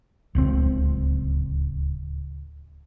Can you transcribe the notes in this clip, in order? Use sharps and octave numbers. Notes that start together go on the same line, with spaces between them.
D1 C#2 C4